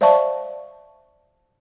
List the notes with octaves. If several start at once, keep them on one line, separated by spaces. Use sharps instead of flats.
C5 D5 E5 F5 A5 C#6